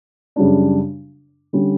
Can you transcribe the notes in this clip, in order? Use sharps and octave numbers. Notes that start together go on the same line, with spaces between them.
F#2 C#3 G3 D4
D3 G3 C#4